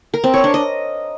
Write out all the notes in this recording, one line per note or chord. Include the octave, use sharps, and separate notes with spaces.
A#4
C4
C#5
D4
D#5